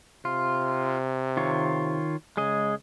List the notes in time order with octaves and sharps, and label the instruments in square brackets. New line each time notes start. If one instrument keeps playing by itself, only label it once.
[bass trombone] C3 [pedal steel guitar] F4
[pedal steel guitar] D#3 F4 C#5
[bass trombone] C#3 [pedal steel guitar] G#3 G#4 D#5